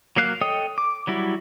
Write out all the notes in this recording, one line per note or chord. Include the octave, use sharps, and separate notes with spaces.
F#3 A#3 F5 F#6
A4 C#5 D#5 G5 D#6
D6
F#3 G3 E4 F#4